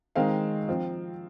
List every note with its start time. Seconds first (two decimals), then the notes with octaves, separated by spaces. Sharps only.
0.16 D#3 G#3 C4 F5
0.68 F3 C4